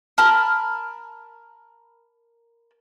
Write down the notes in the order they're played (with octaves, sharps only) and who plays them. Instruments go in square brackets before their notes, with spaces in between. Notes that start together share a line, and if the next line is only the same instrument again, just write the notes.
[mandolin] A#4 A5 B5 F6